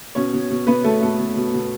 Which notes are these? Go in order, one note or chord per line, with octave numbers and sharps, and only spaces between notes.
B2 C#4 C#5
B2
B2
B2 B3 B4
B2 A3 A4
B2 A3 A4
B2
B2
B2